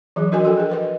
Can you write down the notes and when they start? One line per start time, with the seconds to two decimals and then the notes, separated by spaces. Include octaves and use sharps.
0.16 E3 F#3 G#4
0.32 D4 F#4 A#4 D#5 G#5
0.44 F3 F#4 A4 G5
0.57 G#4 A#4
0.70 A#4 B4 D#5